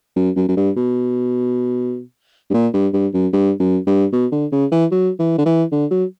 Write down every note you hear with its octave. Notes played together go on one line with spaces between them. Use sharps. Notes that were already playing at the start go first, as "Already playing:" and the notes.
F#2
F#2
F#2
G2
B2
G2
A#2
G2
G2
F#2
G2
F#2
G2
B2
D3
C#3
E3
F#3
E3
D3
E3
D3
F#3